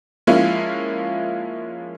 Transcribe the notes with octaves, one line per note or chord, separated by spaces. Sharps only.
F3 G#3 A#3 C#4 E4 F4